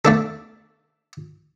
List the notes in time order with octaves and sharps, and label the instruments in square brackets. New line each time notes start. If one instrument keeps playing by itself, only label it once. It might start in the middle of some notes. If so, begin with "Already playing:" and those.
[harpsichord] A3 D4 A4